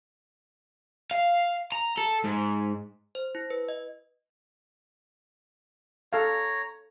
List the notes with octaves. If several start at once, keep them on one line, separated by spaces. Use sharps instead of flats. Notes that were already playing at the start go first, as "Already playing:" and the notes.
F5
A#5
A4
G#2
C5
E4
B4
D#5
A4 C#5 F5 A#5